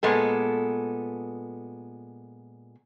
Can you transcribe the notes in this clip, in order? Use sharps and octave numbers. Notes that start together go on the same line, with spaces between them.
A#2 G#3 B3 A4